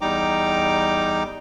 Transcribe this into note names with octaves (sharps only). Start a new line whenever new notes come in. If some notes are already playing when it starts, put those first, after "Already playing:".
E2 G3 D#4 G5 A#5 D6